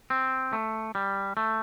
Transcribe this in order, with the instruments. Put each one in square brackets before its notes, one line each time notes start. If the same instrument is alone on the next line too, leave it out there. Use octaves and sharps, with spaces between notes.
[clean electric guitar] C4
A3
G3
A3